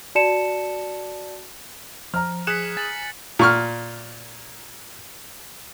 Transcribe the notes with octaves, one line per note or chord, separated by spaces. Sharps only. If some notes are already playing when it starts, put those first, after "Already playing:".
F#4 D5 A5 C#7 E7
F3 A#5 F6
G#4 F#6 B6 C#7 E7
G#5 A6 F#7
A#2 C#6 F6